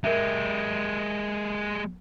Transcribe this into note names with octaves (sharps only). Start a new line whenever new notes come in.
G#3 G4 A#4 E5